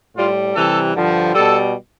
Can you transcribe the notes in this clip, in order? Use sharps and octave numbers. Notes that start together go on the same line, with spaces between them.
A2 G3 F4
C3 E3 G3 A4
G2 D3 F3
B2 G3 A4